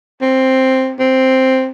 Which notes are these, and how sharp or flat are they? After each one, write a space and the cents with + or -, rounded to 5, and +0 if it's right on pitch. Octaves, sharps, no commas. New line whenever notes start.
C4 +5
C4 +0